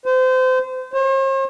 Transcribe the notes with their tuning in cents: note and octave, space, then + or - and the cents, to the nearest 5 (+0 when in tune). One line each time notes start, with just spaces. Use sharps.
C5 -30
C5 +45